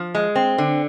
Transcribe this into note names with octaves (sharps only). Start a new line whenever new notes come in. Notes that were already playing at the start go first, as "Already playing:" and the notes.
Already playing: F3
G#3
C4
D3